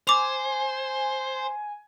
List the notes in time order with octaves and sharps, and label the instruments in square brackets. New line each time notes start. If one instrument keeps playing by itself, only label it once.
[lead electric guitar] C5 [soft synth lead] G#5 [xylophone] D6 F7